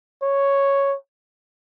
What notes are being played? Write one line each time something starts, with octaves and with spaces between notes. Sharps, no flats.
C#5